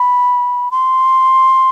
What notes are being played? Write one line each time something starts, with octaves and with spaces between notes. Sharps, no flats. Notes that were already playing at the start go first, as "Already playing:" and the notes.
Already playing: B5
C6